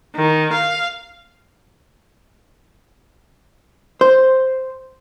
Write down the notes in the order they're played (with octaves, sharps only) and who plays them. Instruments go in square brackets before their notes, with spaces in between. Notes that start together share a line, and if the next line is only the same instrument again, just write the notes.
[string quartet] D#3
F5
[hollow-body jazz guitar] C5